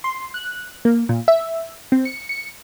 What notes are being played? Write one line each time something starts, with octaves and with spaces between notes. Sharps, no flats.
C6
F#6
A#3
A#2
E5
C4
C#7
C#7